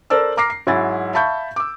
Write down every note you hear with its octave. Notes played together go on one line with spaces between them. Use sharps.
A4 A#4 C5 D5 A5 E6
A#5 D6 F6 A#6 C7
C7
G#2 F#3 E4 G#5 A6
E5 F5 A5 B5 C#6 G6
D6 E6